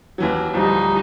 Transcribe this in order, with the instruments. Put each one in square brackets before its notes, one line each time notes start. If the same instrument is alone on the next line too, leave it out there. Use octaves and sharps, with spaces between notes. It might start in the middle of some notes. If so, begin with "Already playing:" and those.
[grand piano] D#2 E3 F#3
[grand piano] D1 F3 [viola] G3 D#4